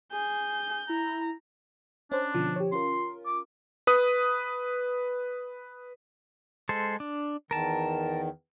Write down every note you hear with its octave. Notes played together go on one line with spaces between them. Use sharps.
G#4 G6
E4 A#5
C#4 D4 C5
B2 D3 F3
G4 C#5
C#4 F4 A#4 C6
D6
B4 D#6
G#3 A4 C5
D4
E2 D#3 A#4 A5